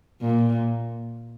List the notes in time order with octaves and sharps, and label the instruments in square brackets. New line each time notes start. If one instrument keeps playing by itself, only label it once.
[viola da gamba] A#2